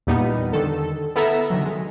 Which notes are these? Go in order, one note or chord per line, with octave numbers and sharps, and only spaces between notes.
E2 A#2 G3 B3 D#4
D3 D#3 A4
B3 E4 A4 E5 A#5
D3 D#3 F#3
G#3